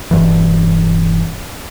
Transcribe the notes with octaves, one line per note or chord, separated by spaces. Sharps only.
E1 G2 E3